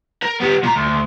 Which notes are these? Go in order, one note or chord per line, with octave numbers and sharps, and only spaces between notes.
A#4
B3 G4
A#2 A#5
D2